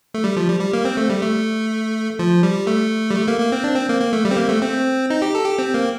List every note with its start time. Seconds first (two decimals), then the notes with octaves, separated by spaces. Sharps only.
0.14 A3
0.24 G3
0.36 F3
0.49 G3
0.60 G3
0.73 A#3
0.85 C4
0.97 A3
1.10 G3
1.22 A3
2.19 F3
2.43 G3
2.67 A3
3.11 G3
3.16 A3
3.28 A#3
3.40 A#3
3.52 C4
3.64 D4
3.76 C4
3.89 A#3
4.01 A#3
4.13 A3
4.25 G3
4.31 C4
4.37 A#3
4.49 A3
4.62 C4
5.10 D#4
5.22 G4
5.35 A4
5.46 G4
5.59 C4
5.74 A#3